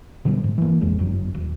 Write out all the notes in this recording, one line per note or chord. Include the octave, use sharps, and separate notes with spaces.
B2 D3 F#3 G3
G#2
E3 A#3
A#1 F2 G#3
G1 F#2 F#3
D#1